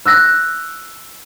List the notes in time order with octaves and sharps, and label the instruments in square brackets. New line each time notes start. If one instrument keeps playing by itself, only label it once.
[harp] E6 F#6 A#6